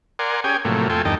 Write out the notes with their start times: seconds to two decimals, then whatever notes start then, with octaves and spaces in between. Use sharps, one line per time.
0.19 A#4 D5 F#5 G#5 C6
0.44 C#4 G4 G#4 G5 G#5
0.65 A2 C3 F3 F#3 A3 A#3
0.90 F2 A3 F4 A4 G5 G#5
1.05 E2 G2 D#3 D#5 G5 A5